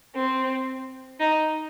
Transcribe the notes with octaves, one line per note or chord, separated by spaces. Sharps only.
C4
D#4